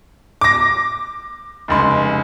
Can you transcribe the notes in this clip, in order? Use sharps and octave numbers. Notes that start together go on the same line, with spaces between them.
D6 A#6
F1 C#2 C6